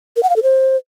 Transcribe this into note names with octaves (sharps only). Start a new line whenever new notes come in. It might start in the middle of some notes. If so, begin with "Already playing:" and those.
A#4
F#5
F5
A4
C5